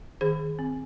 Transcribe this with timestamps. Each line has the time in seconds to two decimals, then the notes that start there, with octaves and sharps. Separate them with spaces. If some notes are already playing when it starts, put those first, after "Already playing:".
0.21 D#3 G#4 C5
0.40 D#3
0.59 C4